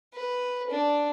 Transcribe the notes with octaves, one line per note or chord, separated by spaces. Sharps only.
B4
D4